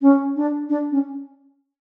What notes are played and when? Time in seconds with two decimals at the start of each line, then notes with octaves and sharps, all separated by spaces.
0.02 C#4
0.36 D4
0.69 D4
0.91 C#4